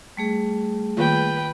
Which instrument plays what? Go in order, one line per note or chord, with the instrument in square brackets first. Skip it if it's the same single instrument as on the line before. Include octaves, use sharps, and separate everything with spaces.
[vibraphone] G3 A3 G#4
[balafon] D#3 A#3 F4 [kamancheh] B4 G5